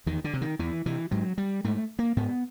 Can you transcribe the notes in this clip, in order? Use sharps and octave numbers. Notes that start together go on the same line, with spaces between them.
E2 D#3
D3
C3
D#3
E2 E3
C3 E3
G#2 F#3
G3
G#2 A3
A#3
G#2 B3